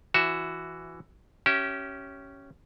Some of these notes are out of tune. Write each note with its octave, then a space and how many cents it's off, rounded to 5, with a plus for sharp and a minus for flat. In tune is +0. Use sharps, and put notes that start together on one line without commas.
E3 +10 F#4 +0 E5 +0
C#4 +0 G4 -25 E5 +0